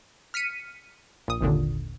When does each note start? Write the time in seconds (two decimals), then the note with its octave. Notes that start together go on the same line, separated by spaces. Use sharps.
0.34 F6 B6 C#7 D#7
1.28 A#1 D#6
1.41 G#1 D#2 A#2 D3